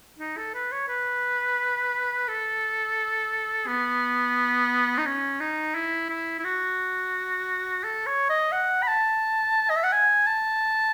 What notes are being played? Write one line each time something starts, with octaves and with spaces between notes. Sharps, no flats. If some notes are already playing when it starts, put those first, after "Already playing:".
D#4
A4
B4
C#5
B4
A4
B3
D#4
C#4
D#4
E4
E4
E4
F#4
A4
C#5
D#5
F#5
B5
A5
D#5
E5
F#5
G#5
A5